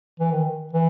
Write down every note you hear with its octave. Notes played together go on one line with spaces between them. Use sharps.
E3
D#3
E3